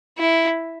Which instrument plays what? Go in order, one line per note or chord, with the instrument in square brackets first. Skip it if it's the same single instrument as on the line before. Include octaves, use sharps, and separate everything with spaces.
[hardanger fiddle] E4